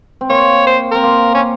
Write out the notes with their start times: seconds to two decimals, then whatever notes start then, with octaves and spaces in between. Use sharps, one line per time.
0.21 C4
0.29 A#3 C#5
0.67 C5
0.91 C4 A#4
1.03 A#3
1.34 C#4